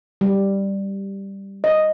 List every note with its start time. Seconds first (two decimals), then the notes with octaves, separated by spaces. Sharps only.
0.21 G3
1.64 D#5